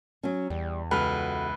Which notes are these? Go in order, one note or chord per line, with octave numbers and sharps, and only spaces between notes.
F#3 C#4
E2 G3
C#2 F#4 A4 B4 F#5 F6